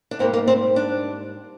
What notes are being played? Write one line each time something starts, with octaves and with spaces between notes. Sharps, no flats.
D4
G#2 G3 A#3 C4
A#3
C4
D4